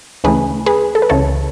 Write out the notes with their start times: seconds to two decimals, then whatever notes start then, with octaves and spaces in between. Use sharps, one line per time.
0.24 D2 C#3 E3 A3 G#4 B4
0.66 G#4 B4
0.95 A4
1.02 B4
1.09 C#2 C#3 E3 A4 C#5